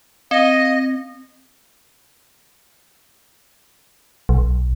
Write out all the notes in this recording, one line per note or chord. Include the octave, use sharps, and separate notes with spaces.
C4 D#5
B1